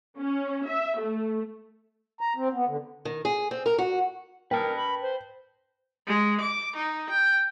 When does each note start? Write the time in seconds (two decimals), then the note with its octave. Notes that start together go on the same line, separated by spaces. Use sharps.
0.17 C#4
0.67 E5
0.99 A3
2.21 A#5
2.36 C4
2.53 B3
2.68 D3
3.05 D#3
3.25 G#4
3.51 C4
3.66 A#4
3.78 F#4
4.51 A#4 B4 G5 A5
4.77 B5
5.02 C5
6.07 G#3
6.40 D6
6.75 D#4
7.09 G5